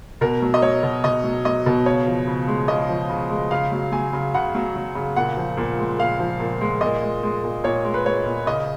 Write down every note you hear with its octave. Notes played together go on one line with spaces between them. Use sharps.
B2 A#4
F#3
D#5
F#3 C#5
B2
B2 D#5
F#3
F#3 D#5
B2
C#3 C#5
F3
C#3
G#3
C#3 D#5
F3
C#3
G#3
C#3 F5
F#3
F#3 G#5
C#3
C#3 F#5
F#3
F#3
C#3
A#2 F#5
F3
A#2
G#3
A#2 F5
F3
A#2
G#3
A#2 D#5
G#3
G#3
A#2
A#2 C#5
G#3
B4
G#3 C#5
A#2
C#3 D#5